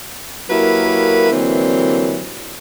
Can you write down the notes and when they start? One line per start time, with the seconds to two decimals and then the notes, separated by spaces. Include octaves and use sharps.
0.49 F#3 A#3 E4 G4 A#4 B4
1.31 D3 E3 F#3 G3 A#3 C4